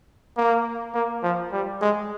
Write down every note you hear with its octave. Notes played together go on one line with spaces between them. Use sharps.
A#3
A#3
F3
G3
G#3